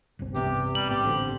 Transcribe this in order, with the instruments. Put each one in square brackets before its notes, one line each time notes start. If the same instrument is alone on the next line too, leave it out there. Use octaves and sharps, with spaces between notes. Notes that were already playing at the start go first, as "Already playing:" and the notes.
[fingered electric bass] G1 C2 C4
[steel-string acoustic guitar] E2 C3 [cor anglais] G4
[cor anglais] G3 [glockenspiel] F#7
[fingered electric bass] A1 G#2 B3 [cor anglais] G4
[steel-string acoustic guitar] D3 C4 F#4